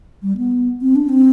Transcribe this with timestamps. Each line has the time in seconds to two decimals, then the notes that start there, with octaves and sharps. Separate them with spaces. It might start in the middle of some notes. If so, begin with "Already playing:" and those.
0.22 G3
0.37 B3
0.81 C4
0.96 D4
1.09 C4